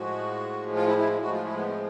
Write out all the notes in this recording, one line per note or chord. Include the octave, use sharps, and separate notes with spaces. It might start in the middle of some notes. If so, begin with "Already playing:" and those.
Already playing: A2 F3 G#3 F#4
F4
E4
E4
A2 F3 G#3 F#4
F4
E4
B3
C4